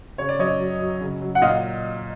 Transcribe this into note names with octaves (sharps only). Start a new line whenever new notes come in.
C#3 C#5
D5
F#2 C#5 D#5
F#3
F#3
C#3
F#3
F#5
A#2 D#5 F5